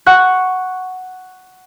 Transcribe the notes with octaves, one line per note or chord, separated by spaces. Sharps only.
F#5 C#6 F#6